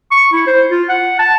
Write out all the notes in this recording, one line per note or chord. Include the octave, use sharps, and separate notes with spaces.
C#6
E4
C5
F4
F#5
A5